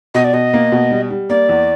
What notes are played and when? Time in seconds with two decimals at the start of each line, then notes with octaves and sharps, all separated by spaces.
0.15 B2 D#5
0.24 D5
0.33 B2 D#5
0.54 A#3
0.72 B2
0.91 G3
1.10 G3
1.29 A#3 D5
1.49 E2